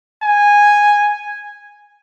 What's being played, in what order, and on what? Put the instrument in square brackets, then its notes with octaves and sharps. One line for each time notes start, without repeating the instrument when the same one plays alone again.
[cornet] G#5